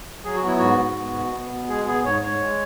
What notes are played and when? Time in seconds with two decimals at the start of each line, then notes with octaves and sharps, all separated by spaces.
0.25 F#3 G#4
0.36 F#4
0.43 B3 E4
0.58 G#2 F#4
0.78 G#2
0.97 B3
1.14 B2
1.32 B3
1.50 B2
1.68 G#3 G#4
1.87 B3 G#4
2.05 G#2 C#5
2.22 G#2 C#5
2.40 G#3